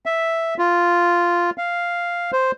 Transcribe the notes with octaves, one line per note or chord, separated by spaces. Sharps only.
E5
F4
F5
C5